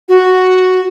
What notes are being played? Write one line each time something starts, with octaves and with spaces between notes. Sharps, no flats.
F#4